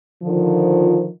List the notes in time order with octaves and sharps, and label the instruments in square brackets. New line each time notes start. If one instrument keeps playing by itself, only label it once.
[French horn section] D3 D#3 F3